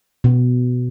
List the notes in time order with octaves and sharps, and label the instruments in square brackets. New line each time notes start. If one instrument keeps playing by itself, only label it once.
[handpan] B2